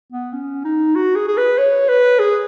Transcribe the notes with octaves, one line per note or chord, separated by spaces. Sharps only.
B3
C#4
D#4
F#4
G#4
G#4
B4
C#5
B4
G#4